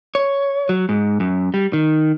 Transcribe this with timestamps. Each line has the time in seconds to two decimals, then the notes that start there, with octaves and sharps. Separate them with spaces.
0.15 C#5
0.69 F#3
0.89 G#2
1.20 F#2
1.54 G3
1.73 D#3